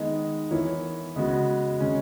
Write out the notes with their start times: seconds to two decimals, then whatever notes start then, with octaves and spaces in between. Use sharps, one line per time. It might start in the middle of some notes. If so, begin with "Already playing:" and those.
Already playing: D#3 G#3 B3 D#4
0.51 E3 B3 E4 A#4 C#5
1.16 C#3 G#3 B3 F#4
1.80 C#3 G#3 C#4